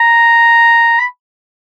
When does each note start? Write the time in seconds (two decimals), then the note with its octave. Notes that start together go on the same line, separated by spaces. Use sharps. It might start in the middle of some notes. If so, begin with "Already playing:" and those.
Already playing: A#5
0.99 B5